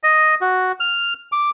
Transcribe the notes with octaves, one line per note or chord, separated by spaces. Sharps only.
D#5
F#4
F6
D6